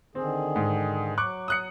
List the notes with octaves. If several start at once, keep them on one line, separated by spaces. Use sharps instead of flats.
D3 D#3 C4 G#4
G#2
F#3 C#6 D6 F#6
D#6 F#6 C#7